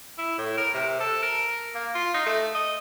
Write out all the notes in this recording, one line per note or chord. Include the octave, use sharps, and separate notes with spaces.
E4
A2
A#4
C3
A4
A#4
A#3
F4
D#4
A3
D#5